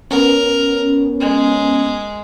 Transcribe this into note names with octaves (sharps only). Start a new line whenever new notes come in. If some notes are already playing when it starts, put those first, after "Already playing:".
B3 C#4 A#4
G#3